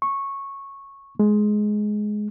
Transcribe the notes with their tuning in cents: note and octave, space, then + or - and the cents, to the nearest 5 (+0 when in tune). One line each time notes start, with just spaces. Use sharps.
C#6 -10
G#3 +15